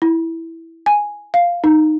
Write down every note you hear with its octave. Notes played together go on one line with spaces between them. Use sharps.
E4
G#5
F5
D#4